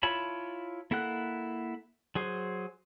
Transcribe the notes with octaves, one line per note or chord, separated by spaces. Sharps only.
E4 F4 C#5 A5 B5
A#3 E4 A4 F#5 F#6
F#3 G#4 C5